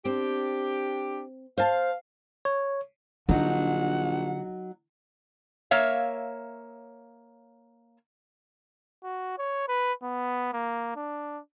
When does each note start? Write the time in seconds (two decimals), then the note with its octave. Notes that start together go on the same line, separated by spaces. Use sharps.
0.05 C4 D4 G4
1.58 C5 F5 A5
2.45 C#5
3.29 A#1 D3 F#3 D#4 F#5
5.71 A#3 C#5 E5 F5
9.04 F#4
9.38 C#5
9.68 B4
10.03 B3
10.53 A#3
10.96 D4